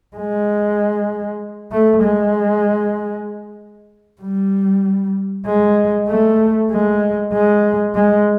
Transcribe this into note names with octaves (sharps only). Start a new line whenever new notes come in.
G#3
A3
G#3
G3
G#3
A3
G#3
G#3
G#3